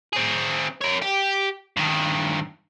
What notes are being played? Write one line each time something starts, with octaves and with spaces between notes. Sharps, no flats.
C4 G#4
A#4 C#5
G4
G2 D#3